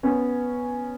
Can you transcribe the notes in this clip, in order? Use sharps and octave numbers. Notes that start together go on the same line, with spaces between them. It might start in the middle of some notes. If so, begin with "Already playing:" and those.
B3 C#4